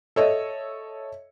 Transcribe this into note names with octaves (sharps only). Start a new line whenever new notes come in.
A4 C#5 D#5 E5